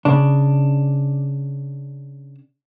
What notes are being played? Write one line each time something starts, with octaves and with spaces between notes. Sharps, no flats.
C#3 D4